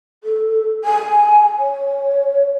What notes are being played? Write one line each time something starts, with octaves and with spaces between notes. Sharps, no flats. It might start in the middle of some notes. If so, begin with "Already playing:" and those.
A4
G#5
C#5